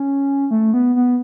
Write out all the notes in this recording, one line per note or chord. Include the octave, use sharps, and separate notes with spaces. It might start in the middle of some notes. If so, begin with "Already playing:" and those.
Already playing: C#4
A3
B3
B3